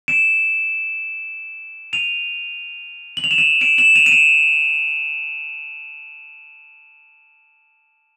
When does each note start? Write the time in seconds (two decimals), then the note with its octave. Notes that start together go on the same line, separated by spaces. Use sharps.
0.08 D7 E7
1.93 D#7 F7
3.17 F#7
3.24 F7
3.31 E7 F#7
3.38 D#7 F7
3.61 D7 E7
3.78 E7 F#7
3.96 D#7 F7
4.06 D#7
4.12 D7 E7